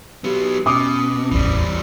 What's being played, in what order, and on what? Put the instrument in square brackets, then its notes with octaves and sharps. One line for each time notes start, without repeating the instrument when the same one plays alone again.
[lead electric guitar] F#3 B3 [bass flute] G4
[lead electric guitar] B2 [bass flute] C#4 [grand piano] D6 D#6
[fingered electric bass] D1 A1 E2 [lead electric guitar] E3 G3